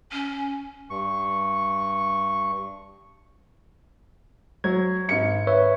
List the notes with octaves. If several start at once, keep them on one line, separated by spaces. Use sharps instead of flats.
C#4
G2 C#6
F#3 G#6
G#1 C#7
B4 C#5 E5